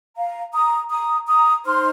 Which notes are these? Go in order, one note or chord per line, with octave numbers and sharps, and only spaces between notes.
F5 A#5
A#5 D#6
A#5 D#6
A#5 D#6
D#4 C5 C6 F6